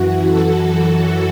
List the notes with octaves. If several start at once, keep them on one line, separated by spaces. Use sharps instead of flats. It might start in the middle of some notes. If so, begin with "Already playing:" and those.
Already playing: F#2 E3 F#4
A4